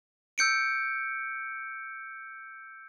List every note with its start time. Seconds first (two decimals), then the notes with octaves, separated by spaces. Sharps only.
0.38 E6 G6 C#7 D7